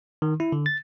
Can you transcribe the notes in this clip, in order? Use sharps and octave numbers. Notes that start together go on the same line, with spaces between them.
D#3
E4
D3
A6